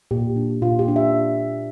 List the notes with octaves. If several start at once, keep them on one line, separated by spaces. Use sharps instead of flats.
A#2 G4
D4
A#2 F4
G4
D4
E5